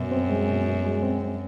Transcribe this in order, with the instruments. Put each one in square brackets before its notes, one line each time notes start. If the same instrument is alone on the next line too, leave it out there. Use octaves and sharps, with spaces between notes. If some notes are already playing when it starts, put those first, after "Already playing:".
Already playing: [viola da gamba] F#2 [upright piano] B2
[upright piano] C4
G#3
B2
B2
G#3
C4
C4